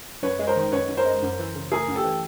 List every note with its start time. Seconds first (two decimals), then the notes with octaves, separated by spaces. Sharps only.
0.23 F#2 B4 C#5
0.39 G#3
0.47 A#4 C5
0.56 D#3
0.72 F#2 B4 C#5
0.88 F#2
0.97 A#4 C5
1.06 G#3
1.22 F#2
1.39 E3
1.55 C#3
1.71 A3 G#4 A#4
1.88 F#2
1.96 G4 A4
2.05 E3